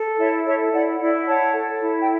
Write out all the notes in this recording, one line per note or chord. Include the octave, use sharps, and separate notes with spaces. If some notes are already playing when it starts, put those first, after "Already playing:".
Already playing: A4
E4 C#5 E5
A4 C#5 E5
E4 D5 F#5
E4 D5 F#5
C#5 F#5 A5
A4
E4
G5